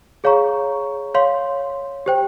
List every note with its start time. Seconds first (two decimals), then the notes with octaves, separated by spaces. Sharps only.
0.24 G#4 C#5 F5 A#5 C#6
1.15 C#5 F5 C6
2.06 G4 C5 G5